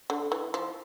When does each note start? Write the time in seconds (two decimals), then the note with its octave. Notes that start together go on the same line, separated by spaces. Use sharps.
0.10 D3
0.32 E3
0.54 F3